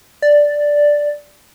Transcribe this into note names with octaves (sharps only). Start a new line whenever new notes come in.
D5